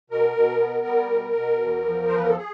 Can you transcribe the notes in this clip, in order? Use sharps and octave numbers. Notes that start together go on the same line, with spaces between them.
B2 A#4
B2
B3
G3
B2
B2
E2
F3
C5
E2 B4
A#4
A4
G#4